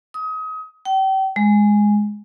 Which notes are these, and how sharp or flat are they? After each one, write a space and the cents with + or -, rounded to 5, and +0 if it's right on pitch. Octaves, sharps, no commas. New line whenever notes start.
D#6 +30
G5 -35
G#3 +0